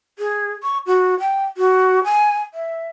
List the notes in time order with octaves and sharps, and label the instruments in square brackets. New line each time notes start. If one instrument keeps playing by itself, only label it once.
[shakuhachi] G#4
C#6
F#4
G5
F#4
G#5
E5